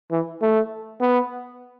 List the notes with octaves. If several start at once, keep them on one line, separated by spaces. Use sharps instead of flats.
E3
A3
B3